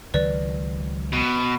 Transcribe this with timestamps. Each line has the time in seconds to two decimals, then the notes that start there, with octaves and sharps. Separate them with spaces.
0.14 C#2 D#3 F#3 B4 D5
1.13 B2